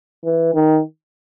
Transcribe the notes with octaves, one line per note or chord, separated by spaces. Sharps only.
E3
D#3